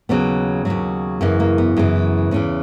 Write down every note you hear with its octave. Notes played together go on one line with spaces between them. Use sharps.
D#2 C#3 F#3 B3
D#2 C#3 F#3
F#2 C#3 E3 A#3
A#3
B3
F#2 C#3 E3
E2 C#3 E3 C#4